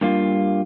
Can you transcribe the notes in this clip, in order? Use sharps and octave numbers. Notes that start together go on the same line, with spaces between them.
G2 G3 A#3 F4